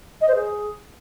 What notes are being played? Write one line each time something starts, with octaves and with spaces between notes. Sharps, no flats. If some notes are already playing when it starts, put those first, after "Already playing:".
D#5
C5
G#4